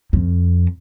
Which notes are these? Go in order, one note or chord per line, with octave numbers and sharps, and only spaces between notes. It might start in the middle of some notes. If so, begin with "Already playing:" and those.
F2